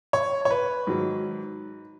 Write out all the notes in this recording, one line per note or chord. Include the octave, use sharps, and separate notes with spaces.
C#5
C#5
B4
G#2 D#3 F#3